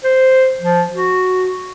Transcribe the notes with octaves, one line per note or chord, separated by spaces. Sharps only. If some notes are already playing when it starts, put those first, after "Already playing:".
C5
F3
F#4